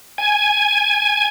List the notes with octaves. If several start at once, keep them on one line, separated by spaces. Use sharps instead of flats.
G#5